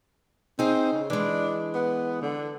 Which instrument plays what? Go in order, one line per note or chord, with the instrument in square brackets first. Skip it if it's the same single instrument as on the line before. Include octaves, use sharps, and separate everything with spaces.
[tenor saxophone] C4 [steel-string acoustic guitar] D#4 G#4
[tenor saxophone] C#3
[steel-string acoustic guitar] E3 G#3 [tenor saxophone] D4
[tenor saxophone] B3
D3